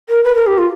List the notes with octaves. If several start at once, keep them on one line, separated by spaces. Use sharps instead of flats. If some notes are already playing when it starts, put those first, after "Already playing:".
A#4
B4
A#4
G4
F4